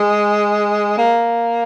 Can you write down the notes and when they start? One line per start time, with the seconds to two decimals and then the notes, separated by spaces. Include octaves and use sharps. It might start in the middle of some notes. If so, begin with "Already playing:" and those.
Already playing: G#3
0.98 A#3